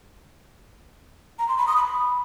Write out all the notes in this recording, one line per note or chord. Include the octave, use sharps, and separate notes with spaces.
A#5
C6
B5
D#6
B5